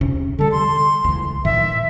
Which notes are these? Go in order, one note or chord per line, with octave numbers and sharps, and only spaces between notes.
E2 C3 C#4
D3 G3 A4
C6
C#2 E3
A#2 D#3 E3 E5